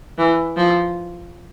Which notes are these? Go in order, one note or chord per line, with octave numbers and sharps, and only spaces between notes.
E3
F3